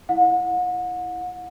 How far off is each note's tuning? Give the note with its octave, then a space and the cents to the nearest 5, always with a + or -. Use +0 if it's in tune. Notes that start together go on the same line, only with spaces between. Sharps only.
E4 +0 F#5 -35